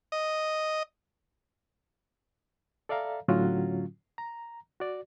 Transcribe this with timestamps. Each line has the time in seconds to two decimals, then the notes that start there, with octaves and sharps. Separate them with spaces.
0.12 D#5
2.89 A4 D5 E5 F5 A#5
3.28 A2 D3 F#3 C#4 F4 F#4
4.18 A#5
4.80 F#4 D5